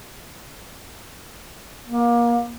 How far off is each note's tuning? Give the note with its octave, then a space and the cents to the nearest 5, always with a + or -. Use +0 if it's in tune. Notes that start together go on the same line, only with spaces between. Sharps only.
A#3 +25